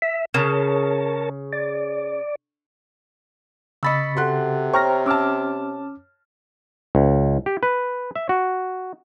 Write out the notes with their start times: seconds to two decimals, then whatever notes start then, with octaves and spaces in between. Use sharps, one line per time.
0.02 E5
0.34 C#3 A#4 C#5 A5
1.53 D5
3.83 C#3 D#5 B5 C#6 E6 A6 B6 C#7
4.17 C3 F#4 A4 F#5 C6 F#6
4.74 C5 C#5 G5 A#5 C#6 F6 A#6
5.06 C#4 A5 D6 E6 F6
6.95 C#2
7.46 G4
7.63 B4
8.15 E5
8.29 F#4